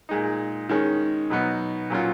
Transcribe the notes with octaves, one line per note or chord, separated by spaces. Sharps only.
A#2 G#3 D#4
D#3 G#3 C#4
B2 F#3 B3 D#4
A#2 F#3 C#4 F4